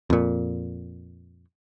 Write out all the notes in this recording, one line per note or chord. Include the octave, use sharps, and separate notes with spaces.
F2 A#2